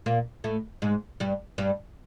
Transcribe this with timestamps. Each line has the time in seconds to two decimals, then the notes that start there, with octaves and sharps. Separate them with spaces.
0.06 A#2 A#3
0.44 A2 A3
0.82 G#2 G#3
1.20 G2 G3
1.58 G2 G3